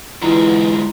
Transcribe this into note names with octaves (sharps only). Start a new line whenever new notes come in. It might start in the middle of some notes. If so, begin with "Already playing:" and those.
G#2 D3 E3 E4 F4 A#5